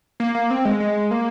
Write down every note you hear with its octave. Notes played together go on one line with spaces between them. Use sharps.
A#3
A#3
C4
G#3
G#3
A#3